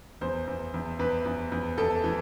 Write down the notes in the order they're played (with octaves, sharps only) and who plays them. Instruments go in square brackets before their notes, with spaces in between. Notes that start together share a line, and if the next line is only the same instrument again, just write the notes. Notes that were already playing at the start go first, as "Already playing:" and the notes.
[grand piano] E2 C5
E2
E2
E2 B4
E2
E2
E2 A4
E3